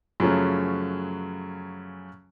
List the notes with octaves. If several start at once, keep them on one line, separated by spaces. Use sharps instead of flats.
F#2 C#3 F3 F#3 A3 C#4